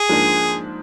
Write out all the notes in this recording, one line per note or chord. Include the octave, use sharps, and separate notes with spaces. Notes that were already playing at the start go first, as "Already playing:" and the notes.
Already playing: G#4
G#2 F3 A#3 D4